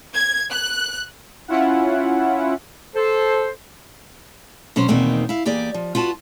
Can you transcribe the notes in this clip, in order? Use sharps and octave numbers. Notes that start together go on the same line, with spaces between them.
G#6
F#6
C#4 E4 F4 F#5
A4 C5
B2 F#3 C#4 C5
E2 B2 D#3 A#3 C4 D#4
E4 F5
E2 A#3 G4 G#4 D5
F3
F4 F#4 B4 A5